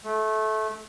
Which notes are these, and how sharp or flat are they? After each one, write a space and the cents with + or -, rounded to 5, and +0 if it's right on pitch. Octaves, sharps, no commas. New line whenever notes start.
A3 -20